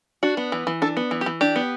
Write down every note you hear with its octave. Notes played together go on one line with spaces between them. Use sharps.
D4 F#4
B3
E3
E3
D4 A4
B3
E3
G4
E3
D4 G4
B3